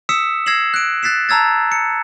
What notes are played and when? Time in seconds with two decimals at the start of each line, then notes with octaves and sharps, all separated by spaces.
0.09 D#6 E6 B6 C#7 E7
0.46 E6 G#6 A#6 C7 E7 F#7
0.74 F#6 D7
1.03 F#6 A6 B6 C7 E7
1.29 A5 A#5 E6 G#6 A6
1.72 C#7